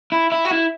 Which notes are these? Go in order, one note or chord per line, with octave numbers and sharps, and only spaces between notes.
E4
E4
F#4
E4